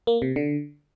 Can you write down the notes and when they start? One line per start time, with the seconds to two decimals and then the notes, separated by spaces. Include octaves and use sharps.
0.07 A#3
0.22 C3
0.36 D3